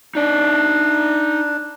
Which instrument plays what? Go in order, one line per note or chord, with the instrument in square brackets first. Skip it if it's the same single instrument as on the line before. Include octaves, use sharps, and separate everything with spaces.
[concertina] D4 [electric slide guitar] D#4 D5